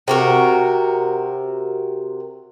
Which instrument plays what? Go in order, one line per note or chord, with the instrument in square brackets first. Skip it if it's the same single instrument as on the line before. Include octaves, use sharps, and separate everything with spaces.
[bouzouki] C3 F#4 A#4